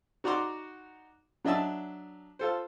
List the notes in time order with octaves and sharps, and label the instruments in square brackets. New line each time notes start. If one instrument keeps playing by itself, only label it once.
[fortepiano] D#4 F#4 D5 A#5 C6 D6
F#3 D4 D#5 E5 A5
F4 A4 C5